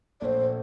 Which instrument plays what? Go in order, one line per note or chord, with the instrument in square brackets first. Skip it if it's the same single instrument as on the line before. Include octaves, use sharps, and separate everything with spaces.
[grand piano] A#1 A#2 A3 [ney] C5 D5